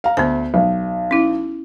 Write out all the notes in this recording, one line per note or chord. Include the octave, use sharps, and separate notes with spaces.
F5 A#5
D2 B3 C5
B1
C#4 E4